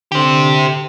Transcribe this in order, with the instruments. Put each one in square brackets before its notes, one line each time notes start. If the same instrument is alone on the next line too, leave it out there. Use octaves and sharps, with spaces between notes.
[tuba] D3 [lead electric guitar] G4 C5